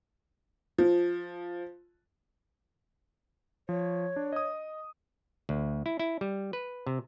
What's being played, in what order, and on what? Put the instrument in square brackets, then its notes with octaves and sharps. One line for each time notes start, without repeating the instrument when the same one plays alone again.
[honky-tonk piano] F3
[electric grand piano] F3 [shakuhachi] C#5
[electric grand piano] D4
D#5 D#6
[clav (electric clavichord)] D2
E4
E4
G3
B4
C3